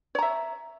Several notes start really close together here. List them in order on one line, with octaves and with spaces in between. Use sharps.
C#5 A#5 E5